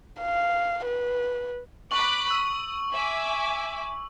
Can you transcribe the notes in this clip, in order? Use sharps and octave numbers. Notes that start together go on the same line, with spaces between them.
F5
B4
B5 C#6 D6 F#6 F#7
D#6 E6
E5 G#5 D6